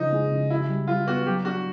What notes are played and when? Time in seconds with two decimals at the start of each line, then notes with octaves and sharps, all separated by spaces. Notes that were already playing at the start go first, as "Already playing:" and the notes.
Already playing: C#3 F3 D#4
0.12 G#3
0.31 C#3
0.50 E4 F#4
0.68 G3
0.87 G3 F4
1.06 B3 F#4
1.26 F#3 G4
1.45 D4 F#4